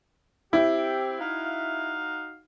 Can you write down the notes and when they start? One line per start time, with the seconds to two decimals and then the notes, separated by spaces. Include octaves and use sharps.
0.53 C4 E4 G4
1.20 D#4 F#4 F5